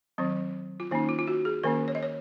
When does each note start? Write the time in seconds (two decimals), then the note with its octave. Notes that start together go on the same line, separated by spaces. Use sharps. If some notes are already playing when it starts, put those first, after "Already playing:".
0.18 D#3 F#3 C4
0.80 F4
0.91 D#3 A#3 C#4 D#4
1.09 F4
1.19 F4
1.28 F#4
1.45 G#4
1.63 D#3 A#3 C#4 A#4
1.88 C#5
1.95 D#5
2.03 C#5